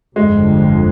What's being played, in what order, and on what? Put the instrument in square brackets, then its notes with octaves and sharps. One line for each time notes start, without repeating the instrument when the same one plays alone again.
[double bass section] G1 F2 D3 [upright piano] G#3